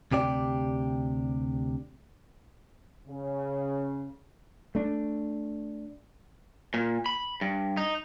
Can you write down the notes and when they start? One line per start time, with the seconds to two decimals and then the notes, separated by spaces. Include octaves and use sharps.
0.11 D2 C3 G4 D5
3.07 C#3
4.75 A3 D4
6.74 A#2
7.06 B5
7.41 G2
7.77 D#4